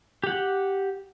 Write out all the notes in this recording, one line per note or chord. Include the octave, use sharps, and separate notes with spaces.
G4 F#5